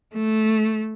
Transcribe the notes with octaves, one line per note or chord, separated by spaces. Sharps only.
A3